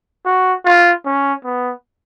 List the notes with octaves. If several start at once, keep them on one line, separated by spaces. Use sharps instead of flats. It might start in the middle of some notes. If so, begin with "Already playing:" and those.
F#4
F4
C#4
B3